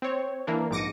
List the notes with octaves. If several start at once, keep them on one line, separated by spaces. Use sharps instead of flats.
C4 C#5
E3 A#3 D4
A#1 G#2 D6 A#6 C#7 D#7